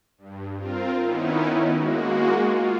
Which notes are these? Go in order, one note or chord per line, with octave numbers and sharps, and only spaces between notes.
G2
C4 F4 A#4
D#3 B3 C#4 D#4 E4
G#3 A#3 F#4
F4